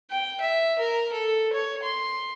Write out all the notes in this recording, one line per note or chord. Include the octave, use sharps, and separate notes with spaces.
G5
E5
A#4
A4
C#5
C6